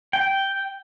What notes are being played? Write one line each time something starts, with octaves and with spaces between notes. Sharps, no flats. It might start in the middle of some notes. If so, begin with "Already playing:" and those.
G5